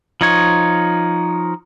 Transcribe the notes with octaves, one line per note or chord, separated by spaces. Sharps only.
F3 D#4 C#5